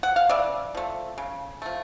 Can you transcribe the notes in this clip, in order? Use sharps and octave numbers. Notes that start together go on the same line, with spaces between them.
F#5
F5
C#3 D5 E5
F3 A3
C#3
F3 A3